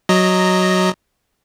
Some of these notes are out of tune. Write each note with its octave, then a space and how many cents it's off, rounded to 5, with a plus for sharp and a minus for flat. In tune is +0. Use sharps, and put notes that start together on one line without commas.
F#3 +0 D#5 +0 A#5 -10